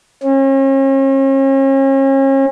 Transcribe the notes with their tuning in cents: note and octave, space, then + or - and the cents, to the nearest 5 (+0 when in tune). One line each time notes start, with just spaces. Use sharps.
C#4 -40